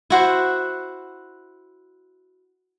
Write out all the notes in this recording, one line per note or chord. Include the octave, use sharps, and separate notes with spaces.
E4 F#4 C5